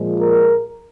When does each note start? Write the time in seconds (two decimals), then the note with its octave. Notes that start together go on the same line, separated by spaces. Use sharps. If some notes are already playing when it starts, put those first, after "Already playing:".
Already playing: A#2 F3 G#3
0.19 A#4